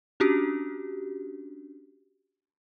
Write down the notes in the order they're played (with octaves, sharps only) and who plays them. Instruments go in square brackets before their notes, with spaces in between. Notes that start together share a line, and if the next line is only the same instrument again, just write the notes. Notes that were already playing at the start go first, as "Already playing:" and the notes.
[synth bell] C#4 D4 F#4 G4